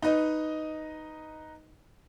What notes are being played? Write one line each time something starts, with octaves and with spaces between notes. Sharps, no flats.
D#4 B4 D#5